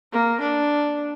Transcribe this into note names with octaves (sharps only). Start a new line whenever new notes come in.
A#3
D4